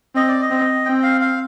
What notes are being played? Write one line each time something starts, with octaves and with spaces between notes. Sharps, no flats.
C4 D#5
D5
D#5
C4
C4 G5
F5
F5